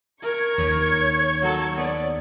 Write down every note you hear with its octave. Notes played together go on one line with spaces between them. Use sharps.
A#4 C#6 G#6
D#2 C#5
F#3 A4
B3 D5